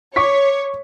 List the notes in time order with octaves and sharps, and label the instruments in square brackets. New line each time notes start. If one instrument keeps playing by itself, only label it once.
[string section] C#5 [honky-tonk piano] C#6 D6 B6